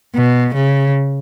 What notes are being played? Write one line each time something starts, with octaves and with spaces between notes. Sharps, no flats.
B2
C#3